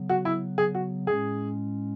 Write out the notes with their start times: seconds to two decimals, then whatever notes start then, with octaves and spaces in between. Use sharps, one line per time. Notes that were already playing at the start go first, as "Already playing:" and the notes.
Already playing: C#3 F#3 B3
0.09 F#4
0.25 E4
0.58 G#4
0.75 F#4
1.07 A2 G#3 C#4 G#4